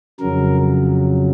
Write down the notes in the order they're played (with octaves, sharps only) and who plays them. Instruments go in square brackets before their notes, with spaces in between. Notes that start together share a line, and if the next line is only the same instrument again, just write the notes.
[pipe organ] F2 C#3 F#3 A#4